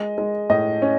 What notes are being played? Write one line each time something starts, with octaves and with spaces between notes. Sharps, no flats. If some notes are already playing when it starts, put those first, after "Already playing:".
Already playing: G#3 D#5
G#3
A2 D#5
C#4